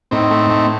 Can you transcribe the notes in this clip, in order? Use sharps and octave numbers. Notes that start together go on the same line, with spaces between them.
A2 C4 D#4
A3
A2